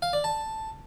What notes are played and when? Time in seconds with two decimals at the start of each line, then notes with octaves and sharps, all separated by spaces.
0.02 F5
0.13 D5
0.24 A5